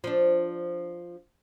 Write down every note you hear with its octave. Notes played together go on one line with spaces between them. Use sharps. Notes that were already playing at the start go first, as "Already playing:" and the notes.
F3 D4